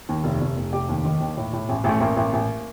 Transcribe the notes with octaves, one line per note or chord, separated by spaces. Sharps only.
D#2
F1
F1
F1
F1 G4
D#2
D#3
D#2
A2
A2
A1
A1 A3
A1 A#3
A1
A1